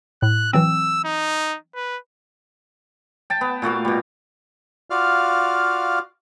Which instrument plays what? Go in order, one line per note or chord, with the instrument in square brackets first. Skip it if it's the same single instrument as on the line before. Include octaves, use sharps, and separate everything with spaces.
[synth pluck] A2 [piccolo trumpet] F#6
[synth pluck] E3 F#3 C4 [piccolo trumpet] E6
[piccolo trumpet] D#4
B4
[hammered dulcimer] G5 A5
B3
A#2 A3 F#4 F5
B2 G3
[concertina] F4 F#4 D5 F5 F6